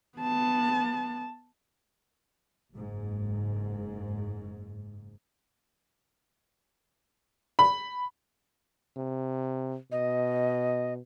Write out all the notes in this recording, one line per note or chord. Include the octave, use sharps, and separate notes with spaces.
B3 A5
F#1 G#2
B5
C3
B2 D#5